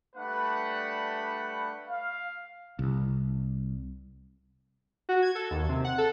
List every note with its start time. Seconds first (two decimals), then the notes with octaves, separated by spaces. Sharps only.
0.16 G3 A3 D4 B4 F#5 B5
1.88 F5
2.79 C2
5.09 F#4
5.22 G#6
5.35 A4
5.51 D#2
5.69 C3
5.84 F#5
5.98 A4